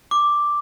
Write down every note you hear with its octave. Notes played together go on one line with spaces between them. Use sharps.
D6